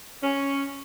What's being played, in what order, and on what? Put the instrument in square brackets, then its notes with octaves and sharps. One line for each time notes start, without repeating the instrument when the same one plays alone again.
[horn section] C#4